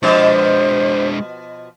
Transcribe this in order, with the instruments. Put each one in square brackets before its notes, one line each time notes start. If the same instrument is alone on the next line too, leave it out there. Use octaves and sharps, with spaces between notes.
[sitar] B2 F3 [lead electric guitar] G#3 D4 [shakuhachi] C5